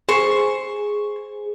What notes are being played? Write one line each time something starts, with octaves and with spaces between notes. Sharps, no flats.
G#4 C5 C#6